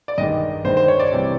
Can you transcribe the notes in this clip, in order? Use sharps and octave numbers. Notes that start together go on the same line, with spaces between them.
D5
G2 D#3 G#3 D#5
G2 D#3 G#3 C5
C5
C#5
D5
C3 E3 G3